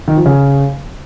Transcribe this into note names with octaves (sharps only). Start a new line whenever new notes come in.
D#3
F3
C#3